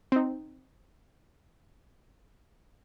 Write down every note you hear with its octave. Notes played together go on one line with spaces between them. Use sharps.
C4 D#4